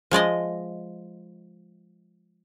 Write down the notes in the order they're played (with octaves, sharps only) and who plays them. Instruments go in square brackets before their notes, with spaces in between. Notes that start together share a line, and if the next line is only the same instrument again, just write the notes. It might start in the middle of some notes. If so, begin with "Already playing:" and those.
[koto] F3 G#3 D5 D#5